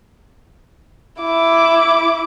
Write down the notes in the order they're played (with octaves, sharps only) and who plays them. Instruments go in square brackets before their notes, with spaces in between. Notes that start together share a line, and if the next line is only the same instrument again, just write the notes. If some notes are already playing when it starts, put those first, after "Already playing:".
[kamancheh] E4 D6